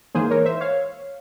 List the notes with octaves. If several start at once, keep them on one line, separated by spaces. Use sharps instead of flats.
G#2 E3 A#3 G#4 C5
A#4 C#5
C5 E5
C#5 F5